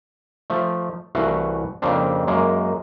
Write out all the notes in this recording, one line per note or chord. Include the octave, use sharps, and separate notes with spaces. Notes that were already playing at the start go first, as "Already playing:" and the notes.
F3 A3
C2 E3 A3 F#4 F5
F2 C#3 A#3 C4 D4
F#2 G#3 A#3